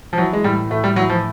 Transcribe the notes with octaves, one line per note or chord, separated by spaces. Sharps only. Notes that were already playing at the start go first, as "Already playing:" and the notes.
F3
E3 F#3
G#3
A2 G3
A2 A3
G3
E3 F#3
F3